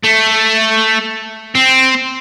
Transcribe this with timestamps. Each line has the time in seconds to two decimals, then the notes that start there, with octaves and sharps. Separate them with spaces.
0.03 A3
1.55 C4